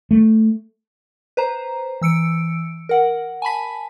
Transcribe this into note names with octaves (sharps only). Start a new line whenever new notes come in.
A3
B4 C5 A#5
E3 E6 C#7 D7
A#4 F#5
G#5 A5 B5 B6